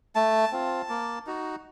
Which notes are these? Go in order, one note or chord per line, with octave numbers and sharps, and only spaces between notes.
A3 A5
C4 F4
A#3
D#4 F#4